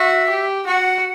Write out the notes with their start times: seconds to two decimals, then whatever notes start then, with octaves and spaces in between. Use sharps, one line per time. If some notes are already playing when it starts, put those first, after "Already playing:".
Already playing: F#4 E5
0.30 G4
0.66 F#4 F#5